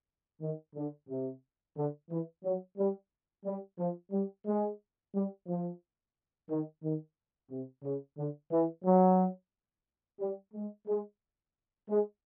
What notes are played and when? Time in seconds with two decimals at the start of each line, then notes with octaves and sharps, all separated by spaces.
0.41 D#3
0.75 D3
1.08 C3
1.76 D3
2.09 E3
2.44 F#3
2.77 G3
3.44 G3
3.78 F3
4.11 G3
4.45 G#3
5.14 G3
5.47 F3
6.48 D#3
6.82 D#3
7.50 C3
7.83 C#3
8.17 D3
8.51 E3
8.84 F#3
10.19 G3
10.54 G#3
10.87 G#3
11.89 G#3